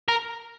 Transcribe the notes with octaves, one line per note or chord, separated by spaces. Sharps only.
A#4